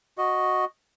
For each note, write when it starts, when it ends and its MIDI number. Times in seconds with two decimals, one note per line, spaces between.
0.18 0.65 66
0.18 0.65 75